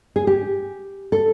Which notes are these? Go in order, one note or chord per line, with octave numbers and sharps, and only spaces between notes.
G#4
G4
A4